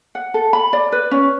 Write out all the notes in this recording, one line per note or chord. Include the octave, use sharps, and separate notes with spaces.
F#5
A4
B5
D5
B4
C#4